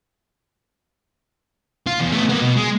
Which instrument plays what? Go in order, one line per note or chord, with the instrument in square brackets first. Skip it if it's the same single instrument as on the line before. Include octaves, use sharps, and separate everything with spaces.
[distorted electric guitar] F4
E2
A3 B3
A#3 B3
B2
G#3